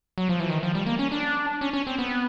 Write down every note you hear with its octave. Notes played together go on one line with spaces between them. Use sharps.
F#3
F3
E3
D#3
F3
G3
A#3
C#4
D4
C#4
C#4
C4
B3